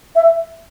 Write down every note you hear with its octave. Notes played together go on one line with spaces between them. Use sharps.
E5